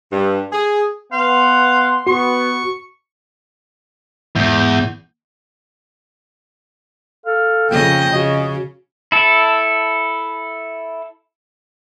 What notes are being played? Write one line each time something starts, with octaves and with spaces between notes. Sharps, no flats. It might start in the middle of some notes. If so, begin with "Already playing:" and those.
G2
G#4
B3 F5 F#5 C6
B3 F#4 C#6
E2 G#2 G6
A4 F5
F2 C#3 D#5 G5
C#3 F#4 D#5
E4 A4